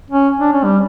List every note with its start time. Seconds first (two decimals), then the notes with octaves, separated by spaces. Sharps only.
0.11 C#4
0.40 D4
0.53 C#4
0.64 G3